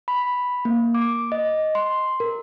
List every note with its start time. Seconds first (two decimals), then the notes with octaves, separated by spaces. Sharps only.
0.08 B5
0.65 A#3
0.94 D6
1.32 D#5
1.75 C6
2.20 A#4